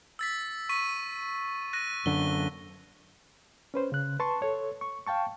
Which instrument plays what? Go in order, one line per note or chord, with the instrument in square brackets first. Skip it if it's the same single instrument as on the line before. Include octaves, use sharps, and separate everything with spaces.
[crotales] E6 A6 B6
C#6 B6 D#7
F#6 A#6 D#7
[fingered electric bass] F#2 D3 [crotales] G7
[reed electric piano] C#4 B4 C5
C#3 F#6
B4 A5 C6 C#6
A4 C#5
C#6
F5 G5 A5 C#6